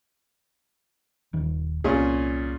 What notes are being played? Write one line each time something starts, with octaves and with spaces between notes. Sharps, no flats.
D#1 D#3
C2 A#2 C4 C#4 G#4